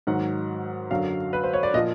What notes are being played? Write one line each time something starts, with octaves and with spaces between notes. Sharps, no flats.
G#2 D#3 F#3 F#5
F#2 D3 F#3 F5
B4
C5
C#5
D5
A#2 F3 D#5